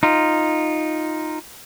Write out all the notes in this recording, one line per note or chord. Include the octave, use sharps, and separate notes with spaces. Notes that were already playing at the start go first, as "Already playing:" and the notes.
D#4 F4